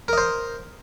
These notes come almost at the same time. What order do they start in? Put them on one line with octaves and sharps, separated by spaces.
A#4 D#5 C5